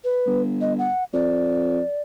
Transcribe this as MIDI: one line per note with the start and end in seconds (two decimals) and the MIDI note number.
0.04 0.42 71
0.26 0.88 31
0.61 0.74 75
0.79 1.04 78
1.13 1.80 41
1.13 2.02 74